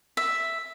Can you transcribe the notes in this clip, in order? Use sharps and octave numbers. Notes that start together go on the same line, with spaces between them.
E5